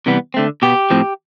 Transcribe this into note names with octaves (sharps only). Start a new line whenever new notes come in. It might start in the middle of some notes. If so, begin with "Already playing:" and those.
C3 E3 G3 B3
D3 A3 C4
B2 B3 G4
A2 F3 C4